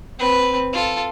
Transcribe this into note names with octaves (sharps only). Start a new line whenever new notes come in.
C4 B4
F4 A4